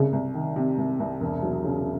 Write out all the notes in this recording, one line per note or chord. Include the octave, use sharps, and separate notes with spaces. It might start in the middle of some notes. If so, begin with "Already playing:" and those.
Already playing: C2 C#3
C2
D#3
C3
C2
C2
E1
F#3
C#3